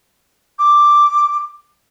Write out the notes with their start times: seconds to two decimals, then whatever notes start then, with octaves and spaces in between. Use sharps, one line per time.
0.58 D6